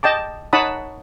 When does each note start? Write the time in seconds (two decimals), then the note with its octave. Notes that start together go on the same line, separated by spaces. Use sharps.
0.03 D#5 G5 A5 D6
0.53 D#4 C#5 F#5 A5 B5 D#6